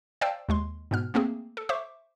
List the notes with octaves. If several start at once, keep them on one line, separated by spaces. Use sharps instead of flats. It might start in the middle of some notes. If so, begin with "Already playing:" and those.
C5 D5 F5 G5 A5 E6
D#2 G#3 C6
G#2 B2 B3 F6
A3 A#3 C4 G#4
A4
C5 E5 C#6 D6